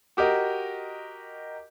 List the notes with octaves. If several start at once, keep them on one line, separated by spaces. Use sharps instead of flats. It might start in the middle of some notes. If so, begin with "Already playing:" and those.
F#4 G4 A#4 D#5